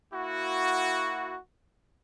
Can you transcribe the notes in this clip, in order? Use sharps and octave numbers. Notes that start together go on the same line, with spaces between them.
A#3 E4 F#4